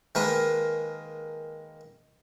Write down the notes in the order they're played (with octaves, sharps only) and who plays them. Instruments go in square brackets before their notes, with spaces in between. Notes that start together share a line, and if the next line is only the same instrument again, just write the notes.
[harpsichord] D#3 G#3 A#3 B4